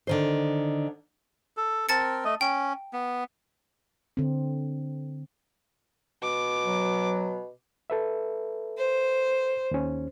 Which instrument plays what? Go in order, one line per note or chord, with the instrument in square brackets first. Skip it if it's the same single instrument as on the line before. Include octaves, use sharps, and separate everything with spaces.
[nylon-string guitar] D3 D#3 C5
[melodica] A4
[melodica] C4 A#4 [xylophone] A5 A6 C#7
[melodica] A3 D#5
[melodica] C#4 [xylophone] G5
[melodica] B3
[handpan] D3 C4
[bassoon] B2 [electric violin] D6
[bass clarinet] F#3
[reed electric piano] A4 B4 E5
[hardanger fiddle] C5
[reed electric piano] D#2 C#4